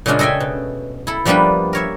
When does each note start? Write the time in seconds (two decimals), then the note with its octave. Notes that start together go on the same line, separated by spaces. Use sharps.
0.06 A#2 C#3 G#3 C#4 D4
0.19 A4 D#5 E5 G5 G#5
0.40 B2
1.07 E4 A4
1.25 F3 G3 A#3 B3 D4 B4
1.73 A#4 C#5 E5